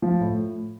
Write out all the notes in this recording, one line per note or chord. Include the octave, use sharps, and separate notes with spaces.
F3
A2